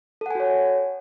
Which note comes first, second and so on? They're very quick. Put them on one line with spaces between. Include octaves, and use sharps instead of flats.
A4 F#5 G#5 F#4 C#5